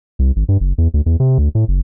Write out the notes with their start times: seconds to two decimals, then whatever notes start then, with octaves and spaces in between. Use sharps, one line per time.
0.19 C2
0.36 G#1
0.48 G2
0.60 F#1
0.78 E2
0.94 D2
1.06 E2
1.20 C3
1.38 D2
1.55 A2
1.68 F#1